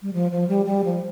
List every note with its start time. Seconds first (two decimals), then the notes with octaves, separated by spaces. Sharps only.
0.02 G3
0.13 F3
0.31 F3
0.48 G3
0.66 G3
0.84 F3